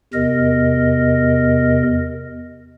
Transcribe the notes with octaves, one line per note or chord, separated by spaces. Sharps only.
E2 C3 A#4 D#5